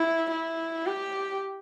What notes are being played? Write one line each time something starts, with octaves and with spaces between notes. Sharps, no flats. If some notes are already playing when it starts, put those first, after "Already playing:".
Already playing: E4
E4
G4